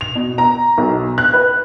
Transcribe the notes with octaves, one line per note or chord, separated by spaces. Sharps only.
F7
B2
A#5
B1
F#6
B4